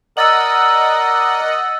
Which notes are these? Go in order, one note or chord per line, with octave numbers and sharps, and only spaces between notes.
A#4 D5 D#5 F#5 E6 A6 F#7